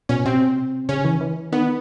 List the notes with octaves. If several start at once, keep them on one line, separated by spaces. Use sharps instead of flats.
B2 C#4
C3 C4
C#3 C#4
E3
E3
D#3 B3